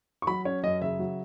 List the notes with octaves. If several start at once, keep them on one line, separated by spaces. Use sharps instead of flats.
C#6
F#3 B5
C#4 C#5
F#2 D#5
C#3 E5
F#3